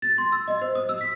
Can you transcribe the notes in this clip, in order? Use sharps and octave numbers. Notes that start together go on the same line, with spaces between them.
A6
C6
E6
D#5
C5
D#6
E6
B6